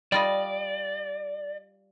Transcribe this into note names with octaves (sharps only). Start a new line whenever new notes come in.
G3 F4 D5 D#5